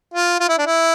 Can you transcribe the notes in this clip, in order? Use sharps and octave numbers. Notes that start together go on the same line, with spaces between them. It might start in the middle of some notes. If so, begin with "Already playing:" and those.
F4
F4
E4
D4
E4